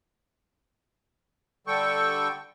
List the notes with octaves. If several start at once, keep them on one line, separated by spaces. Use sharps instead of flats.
D3 G3 A4 G5 C#6